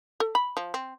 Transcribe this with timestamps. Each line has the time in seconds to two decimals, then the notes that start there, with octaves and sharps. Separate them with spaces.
0.20 A4
0.35 B5
0.57 F3
0.74 C4